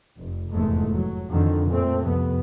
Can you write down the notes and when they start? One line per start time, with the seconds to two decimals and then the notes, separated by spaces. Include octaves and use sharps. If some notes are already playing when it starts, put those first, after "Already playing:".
0.17 F1
0.51 F1 E2 G#2 G#3 A3
0.93 F#3
1.28 F2 D3 D#3
1.68 A#2 A3 C4
1.99 C2 F2 B3